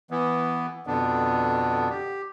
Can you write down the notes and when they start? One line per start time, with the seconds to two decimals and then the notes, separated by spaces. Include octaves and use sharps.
0.11 E3 B3
0.87 F2 B2 D3 B3 D4
1.90 G4